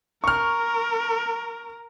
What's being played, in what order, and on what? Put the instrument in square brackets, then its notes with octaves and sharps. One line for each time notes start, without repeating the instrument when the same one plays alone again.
[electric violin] A#4 [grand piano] C#6 F6